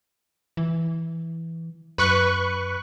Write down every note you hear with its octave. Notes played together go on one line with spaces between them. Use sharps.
E3
F#2 B4 C#6 F#6